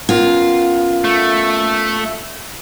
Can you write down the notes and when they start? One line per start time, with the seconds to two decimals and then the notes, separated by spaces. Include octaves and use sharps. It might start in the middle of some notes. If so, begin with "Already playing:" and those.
0.09 B3 C#4 F4 A#4
1.04 A3